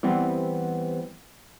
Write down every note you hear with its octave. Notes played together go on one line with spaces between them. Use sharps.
E3 G3 B3 C4